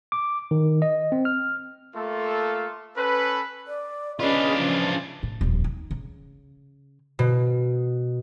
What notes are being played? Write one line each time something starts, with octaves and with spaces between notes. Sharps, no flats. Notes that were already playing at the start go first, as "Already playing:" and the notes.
D6
D#3
D#5
C4
F6
A3 A#3 F4 A4
C#4 A4 B4
D5
C#4 D4 F4 G#4 B4 D5 D#5
C#3 E3 F3
A2
D#1 F2
D#4
C#3
B2